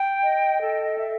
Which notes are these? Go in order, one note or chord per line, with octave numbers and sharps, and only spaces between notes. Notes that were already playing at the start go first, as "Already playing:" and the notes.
Already playing: G5
D#5
A4
E5